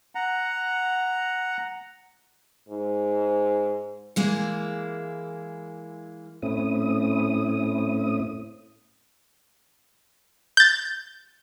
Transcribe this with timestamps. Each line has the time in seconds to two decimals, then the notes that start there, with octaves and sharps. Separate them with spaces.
0.15 F#5 A#5
2.69 G#2
4.16 E3 G#3 A#3 E4
6.42 A2 A3 C4 C#4 E4 D#6
10.57 G6 A6